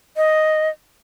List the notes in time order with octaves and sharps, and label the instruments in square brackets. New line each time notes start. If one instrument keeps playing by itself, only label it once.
[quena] D#5